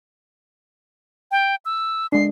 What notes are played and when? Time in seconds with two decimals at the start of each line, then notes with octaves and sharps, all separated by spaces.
1.31 G5
1.65 E6
2.12 G#3 D4 C7